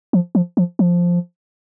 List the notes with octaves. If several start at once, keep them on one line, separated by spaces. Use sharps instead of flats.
F3
F3
F3
F3